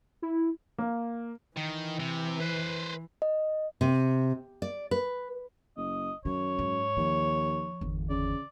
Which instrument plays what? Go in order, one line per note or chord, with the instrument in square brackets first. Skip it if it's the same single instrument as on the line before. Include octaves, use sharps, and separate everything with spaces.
[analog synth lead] E4
[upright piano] A#3
[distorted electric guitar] D#3 [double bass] E3
[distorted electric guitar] C3
B4 C5
[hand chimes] D#5
[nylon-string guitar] C3
D5
B4
[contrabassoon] F#1 [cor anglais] D#5
[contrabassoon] F#2 [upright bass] D#3 [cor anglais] C#5
[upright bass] G#2
[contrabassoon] D#2 [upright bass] F3
[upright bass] G1 E2
[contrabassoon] C#3 [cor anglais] D5